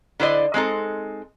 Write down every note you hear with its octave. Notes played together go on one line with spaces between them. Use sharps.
D3 E4 C5 D5 D#5
G#3 C4 D#4 A4